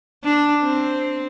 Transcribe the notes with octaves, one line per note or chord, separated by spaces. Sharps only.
D4
C4